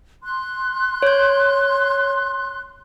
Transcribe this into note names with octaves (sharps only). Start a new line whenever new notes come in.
C6 F#6
C#5 G6